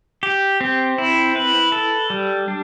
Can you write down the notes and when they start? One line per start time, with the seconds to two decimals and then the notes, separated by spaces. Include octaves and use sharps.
0.23 G4
0.61 C4
0.98 E4
1.36 B4
1.72 A4
2.10 G3
2.48 D4